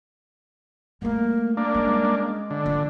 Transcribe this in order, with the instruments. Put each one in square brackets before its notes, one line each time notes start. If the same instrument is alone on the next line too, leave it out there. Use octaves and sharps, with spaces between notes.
[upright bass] G3 A3 [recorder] A#3
[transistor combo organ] A#3 D4
[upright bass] G3 C#4 [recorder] G#3
[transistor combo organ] D3
[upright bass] F3